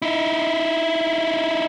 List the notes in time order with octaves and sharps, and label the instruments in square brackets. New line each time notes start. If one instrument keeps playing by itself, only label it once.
[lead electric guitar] D#4 E4